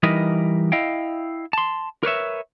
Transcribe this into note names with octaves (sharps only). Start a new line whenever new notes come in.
E3 G3 D#4 A#4 B4 D#5
E4 D#5 F5 G5
A5 C6
A#4 B4 C#5 E5